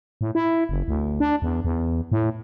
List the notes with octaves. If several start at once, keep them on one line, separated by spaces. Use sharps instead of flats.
A2
E4
F#1
D2
D4
E2
E2
A2